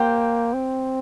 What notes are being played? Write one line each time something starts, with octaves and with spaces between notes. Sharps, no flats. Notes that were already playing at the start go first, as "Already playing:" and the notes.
Already playing: A#3 G4 C5 G5
C4